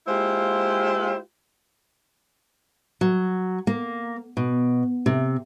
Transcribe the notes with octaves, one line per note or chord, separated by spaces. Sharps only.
G#3 A#3 E4 F4 G4 C5
F#3
A#3
B2
C3